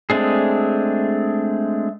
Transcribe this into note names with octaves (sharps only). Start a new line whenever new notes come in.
G#3 A3 C4 D4 G#4